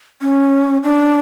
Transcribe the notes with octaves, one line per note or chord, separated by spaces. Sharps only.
C#4
D4